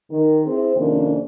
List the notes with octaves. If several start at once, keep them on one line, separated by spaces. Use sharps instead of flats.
D#3
C4 E4 G#4 C5
F2 C3 D#3 A#3 C#4 D4